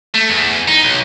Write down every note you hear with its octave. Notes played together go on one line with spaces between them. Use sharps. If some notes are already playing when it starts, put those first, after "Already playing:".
A3
E2
D#4
B1